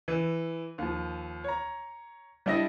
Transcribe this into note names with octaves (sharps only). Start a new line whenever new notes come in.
E3
D#2 F3
C#5 A#5
G3 D4 E4 D#5 A#6